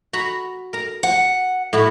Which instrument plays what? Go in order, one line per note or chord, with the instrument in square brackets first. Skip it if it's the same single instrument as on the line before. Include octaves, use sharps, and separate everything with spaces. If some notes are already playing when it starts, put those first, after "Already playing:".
[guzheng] F#4 A#5 B5
A#4 A#5
[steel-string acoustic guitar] F#5
[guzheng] A2 E4 F#4